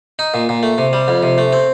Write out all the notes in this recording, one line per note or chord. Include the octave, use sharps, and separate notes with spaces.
D#4
A#2
A#2
A3
C3
G3
F2
C3
A3
C4